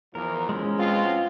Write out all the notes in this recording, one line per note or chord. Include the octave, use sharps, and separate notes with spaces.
E2 F3 A#4
G#3 C#4
B2 C4 F4